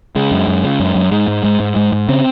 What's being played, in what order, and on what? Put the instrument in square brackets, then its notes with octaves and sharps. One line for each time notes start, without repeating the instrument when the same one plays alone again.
[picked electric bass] C#3 G#3
F#2
F#2
C#3
F#2
F#2
G#2 G#3
G#2
G#2
G#2
G#2
G#2
C#3 C4